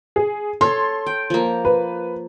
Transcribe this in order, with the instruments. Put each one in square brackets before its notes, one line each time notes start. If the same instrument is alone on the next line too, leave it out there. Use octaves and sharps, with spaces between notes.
[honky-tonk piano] G#4
[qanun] A4 C#5 [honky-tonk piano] C6
[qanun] G5
F3 A#3
[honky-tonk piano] B4